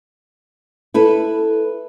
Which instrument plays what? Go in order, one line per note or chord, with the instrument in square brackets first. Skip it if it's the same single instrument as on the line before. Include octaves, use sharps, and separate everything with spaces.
[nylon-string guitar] E4 A4 B4